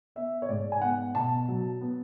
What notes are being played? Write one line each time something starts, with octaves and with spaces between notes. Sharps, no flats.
B3 E5
C#5
G#2 D5
G#5
B3 F#5
B2 A5
F#3
B3